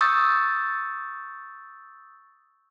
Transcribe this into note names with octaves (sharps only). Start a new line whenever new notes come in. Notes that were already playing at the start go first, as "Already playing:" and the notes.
C#6 D#6 E6 G6 A6